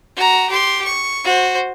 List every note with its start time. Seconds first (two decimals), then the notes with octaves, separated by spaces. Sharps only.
0.16 F#4 A#5
0.50 G4 C6
0.84 C#6
1.25 F#4 C5